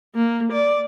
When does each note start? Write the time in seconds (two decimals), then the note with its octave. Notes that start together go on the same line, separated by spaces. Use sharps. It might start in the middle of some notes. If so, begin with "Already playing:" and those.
0.15 A#3
0.52 D5